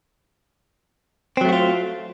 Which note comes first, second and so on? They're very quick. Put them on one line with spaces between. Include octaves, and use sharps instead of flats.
C4 F#3 A3 F#4 F4